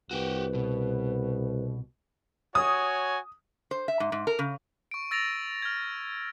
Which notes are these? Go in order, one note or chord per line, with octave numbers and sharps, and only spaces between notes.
C2 F#4 G4 B4
B2
F#4 C#5 G#5 D#6
C5
E5
G#2
G#2
A#4
C#3
C#6 D7
E6 A6 A#6 D7 F7
F6 G#6